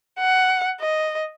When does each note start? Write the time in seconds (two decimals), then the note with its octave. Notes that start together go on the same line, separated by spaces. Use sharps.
0.19 F#5
0.80 D#5